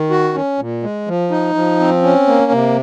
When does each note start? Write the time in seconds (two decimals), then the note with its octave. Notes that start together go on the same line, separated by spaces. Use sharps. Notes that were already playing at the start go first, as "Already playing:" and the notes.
Already playing: D#3
0.10 F#4
0.34 C#4
0.59 A#2
0.83 G#3
1.08 F3
1.31 D#4
1.55 F3
1.80 C4
2.03 C#4
2.28 A#3
2.52 C3